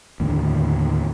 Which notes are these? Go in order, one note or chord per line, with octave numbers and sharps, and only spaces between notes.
D#2 A2 D3